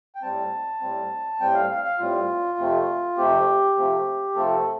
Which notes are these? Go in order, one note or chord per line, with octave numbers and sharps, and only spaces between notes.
G5
A2 G3 C4 A5
A2 G3 C4
A2 G3 C4 G5
F5
F5
F5
A2 G3 C4 F4
F2 C3 A3 C4
F2 C3 A3 C4 G4
C3 F3 A3 C4
C3 F3 A3 C4 A4